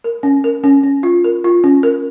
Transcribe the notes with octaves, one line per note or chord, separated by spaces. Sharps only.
A#4
C#4
A#4
C#4
C#4
F4
A#4
F4
C#4
A#4